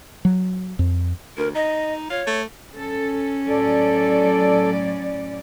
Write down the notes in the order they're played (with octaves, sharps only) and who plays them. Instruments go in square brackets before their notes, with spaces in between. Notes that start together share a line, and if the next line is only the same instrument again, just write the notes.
[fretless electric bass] F#3
F2
[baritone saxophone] D2 [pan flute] A#4
[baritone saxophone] D#4 [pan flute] D#5
[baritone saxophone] F4 [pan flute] C#5
[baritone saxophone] A3
[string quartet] C#4 [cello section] A4
[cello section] A2 F#3 D5 [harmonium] A4